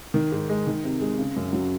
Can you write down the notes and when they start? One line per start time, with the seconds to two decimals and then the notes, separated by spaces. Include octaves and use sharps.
0.14 D#3
0.32 G#2
0.49 G#3
0.67 D#3
0.84 C3
1.01 G#3
1.18 C#3
1.36 F#2
1.53 F#3